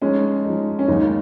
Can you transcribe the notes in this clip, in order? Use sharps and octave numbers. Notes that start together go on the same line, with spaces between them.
F3 G#3 C#4 D#4
F3 G#3 D#4
C#4
D#2 C#3 G#3 D#4